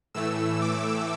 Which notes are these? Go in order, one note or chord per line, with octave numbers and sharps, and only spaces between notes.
A2 E3 A3 E6
D6